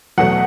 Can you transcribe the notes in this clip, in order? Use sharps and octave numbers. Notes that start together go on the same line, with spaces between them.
E2 B2 F#3 A3 F#5